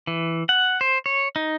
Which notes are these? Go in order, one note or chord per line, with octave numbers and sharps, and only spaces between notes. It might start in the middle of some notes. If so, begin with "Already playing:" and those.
E3
F#5
C5
C#5
D#4